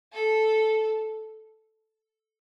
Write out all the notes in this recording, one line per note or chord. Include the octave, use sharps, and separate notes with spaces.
A4